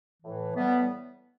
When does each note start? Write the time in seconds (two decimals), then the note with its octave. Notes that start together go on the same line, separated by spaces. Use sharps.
0.22 A2 E3
0.55 A2 E3 G3 B3